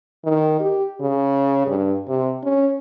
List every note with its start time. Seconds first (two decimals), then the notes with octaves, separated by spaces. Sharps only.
0.24 D#3
0.60 G4
1.01 C#3
1.67 G2
2.08 C3
2.43 C#4